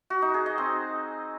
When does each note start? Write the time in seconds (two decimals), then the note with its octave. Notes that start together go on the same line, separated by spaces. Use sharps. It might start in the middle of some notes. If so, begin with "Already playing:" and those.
0.10 F#4
0.22 D#4
0.34 G#4
0.46 D#5
0.58 C4